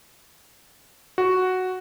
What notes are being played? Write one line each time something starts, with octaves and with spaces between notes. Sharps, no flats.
F#4